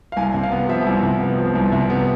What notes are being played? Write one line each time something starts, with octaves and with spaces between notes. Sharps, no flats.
F5
C2 G#5
C3
F5
B3
F3 E5
C2
C3
B3
F3
C2
C3 E5
B3